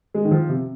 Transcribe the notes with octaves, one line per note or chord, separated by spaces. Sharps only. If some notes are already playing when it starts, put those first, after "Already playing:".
G#3
D#3
F3
C3